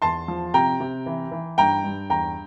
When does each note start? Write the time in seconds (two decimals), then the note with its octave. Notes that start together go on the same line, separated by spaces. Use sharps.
0.02 E2 A5 C6
0.28 F3
0.54 C3 G5 A#5
0.80 C3
1.06 E3
1.32 E3
1.57 G2 G5 A#5
1.84 G2
2.10 E2 G5 A#5